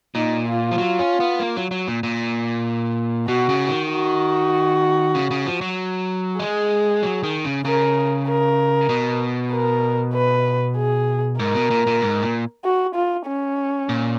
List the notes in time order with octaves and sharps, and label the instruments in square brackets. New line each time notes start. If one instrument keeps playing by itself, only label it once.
[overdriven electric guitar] A#2 [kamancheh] D#4
[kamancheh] F4
[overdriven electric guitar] F3
F#3
C#4
B3
A#3
F#3
F#3
A#2
A#2
[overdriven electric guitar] B2 [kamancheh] F#4
[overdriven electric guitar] C#3
D#3
[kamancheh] F#4
[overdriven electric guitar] C#3
C#3
F3
F#3
[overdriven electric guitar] G#3 [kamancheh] G#4
[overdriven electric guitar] F#3
D#3
C#3
[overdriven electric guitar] C#3 [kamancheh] A#4
[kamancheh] A#4
[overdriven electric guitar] B2
[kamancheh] A#4
B4
G#4
[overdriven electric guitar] G#2 [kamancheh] A#4
[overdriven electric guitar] B2
A#2
A#2
G#2
A#2
[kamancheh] F#4
F4
C#4
[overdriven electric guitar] A#2